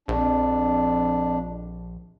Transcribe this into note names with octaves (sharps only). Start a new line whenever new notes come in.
A#1 F2 D4